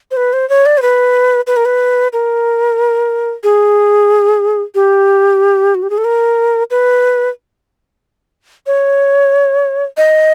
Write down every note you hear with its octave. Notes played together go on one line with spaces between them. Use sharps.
C5
B4
C5
C#5
D5
C5
B4
B4
A#4
B4
A#4
G#4
G4
F#4
G4
G#4
A4
A#4
B4
C#5
D#5